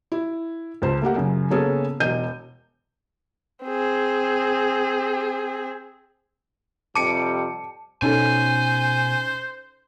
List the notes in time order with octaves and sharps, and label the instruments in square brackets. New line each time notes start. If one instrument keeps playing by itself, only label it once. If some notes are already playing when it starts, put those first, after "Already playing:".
[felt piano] E4
C#2 C5 A5
A3 A#3 G4 F#5
F#2 C#3
C#3 A#3 B3 C#4 G#4 A4
E1 E2 D#5 G6 D#7
[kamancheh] C4 G#4
[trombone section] F2 C3 G3 [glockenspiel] A5 [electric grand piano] D6 C#7 D7
[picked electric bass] B2 [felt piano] C#4 D#4 A4 [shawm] C5 [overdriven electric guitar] G#5